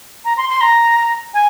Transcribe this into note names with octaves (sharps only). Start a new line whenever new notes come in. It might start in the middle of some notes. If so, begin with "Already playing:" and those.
A#5
C6
C6
A#5
G#5